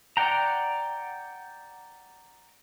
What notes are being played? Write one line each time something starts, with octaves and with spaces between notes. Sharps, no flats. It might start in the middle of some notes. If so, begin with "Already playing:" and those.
D5 F#5 G5 A#5